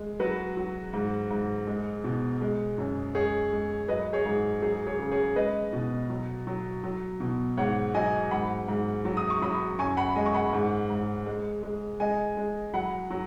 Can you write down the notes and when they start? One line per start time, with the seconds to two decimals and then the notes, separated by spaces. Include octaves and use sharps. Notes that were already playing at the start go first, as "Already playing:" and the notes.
Already playing: G#3
0.20 F#3 F#4 B4
0.57 F#3
0.93 G#2
1.31 G#2
1.67 G#3
2.04 B2
2.41 G#3
2.78 F#2
3.15 G#3 G#4 C#5
3.52 G#3
3.88 F#3 B4 D#5
4.13 G#4 C#5
4.26 G#2
4.62 F#3 G#4
4.87 G#4 C#5
4.99 C#3
5.11 G#4 C#5
5.36 G#3 B4 D#5
5.73 B2
6.10 F#3
6.47 F#3
6.84 F#3
7.20 B2
7.57 G#2 C#5 F#5
7.94 F#3 D#5 G#5
8.31 G#2 F#5 B5
8.68 G#2
9.05 F#3
9.17 D#6
9.30 C#6
9.42 F#3 B5 D#6
9.79 F#2 G#5 C#6
9.97 F#5 B5
10.16 G#3 D#5 G#5
10.26 C#6
10.34 F#5 B5
10.53 G#2
10.89 G#2
11.26 G#3
11.63 G#3
12.00 G#3 D#5 G#5
12.37 G#3
12.74 F#3 F#5 B5
13.10 F#3